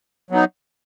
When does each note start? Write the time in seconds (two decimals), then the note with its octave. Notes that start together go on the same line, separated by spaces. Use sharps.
0.31 F#3 B3 D#4